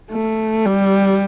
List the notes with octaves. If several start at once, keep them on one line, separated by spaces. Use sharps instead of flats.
A3
G3